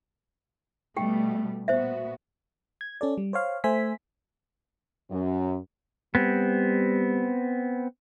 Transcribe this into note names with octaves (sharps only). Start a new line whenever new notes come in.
B2 G3 A3 G4 G5
A#2 B3 F#4 C5 E5
G#6
C#4 A4 D5
G3
C5 C#5 F5
A3 C5 E5 G#5 B6
F#2
G3 B3 C4